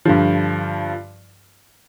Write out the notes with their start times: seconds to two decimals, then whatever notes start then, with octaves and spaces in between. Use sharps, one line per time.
0.05 G2 D3 F3